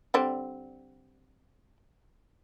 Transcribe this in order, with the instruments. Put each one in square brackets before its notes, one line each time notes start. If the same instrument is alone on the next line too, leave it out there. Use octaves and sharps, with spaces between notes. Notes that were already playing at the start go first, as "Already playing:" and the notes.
[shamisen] D3 G3 C4